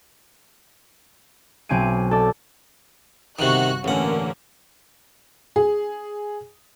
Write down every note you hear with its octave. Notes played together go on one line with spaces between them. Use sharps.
B1 C4 G#5 D7 D#7
A4 D5
G1 C3 D#3 F#4 F#6
A1 D3 A#3 C#4 F#5
G#4